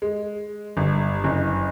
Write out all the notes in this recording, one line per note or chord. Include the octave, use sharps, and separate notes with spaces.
G#3
G1
F#1